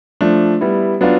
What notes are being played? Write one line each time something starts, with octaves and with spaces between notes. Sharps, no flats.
F3 A3 D4
G3 B3 E4
F#3 B3 D4 F4